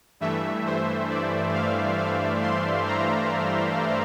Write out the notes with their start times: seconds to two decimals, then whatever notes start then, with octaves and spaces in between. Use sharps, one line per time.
0.20 G2 E3 A3 E5
0.66 C5
1.10 D5
1.54 F5
1.98 F5
2.42 C6
2.87 A#5